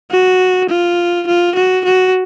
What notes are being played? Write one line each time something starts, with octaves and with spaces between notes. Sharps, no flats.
F#4
F4
F4
F#4
F#4